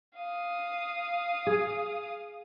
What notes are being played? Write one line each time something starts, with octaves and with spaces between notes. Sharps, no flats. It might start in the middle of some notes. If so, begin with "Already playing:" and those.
F5 D#6
G#4